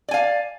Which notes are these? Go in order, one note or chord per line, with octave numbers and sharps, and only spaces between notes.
D5 F5 G#5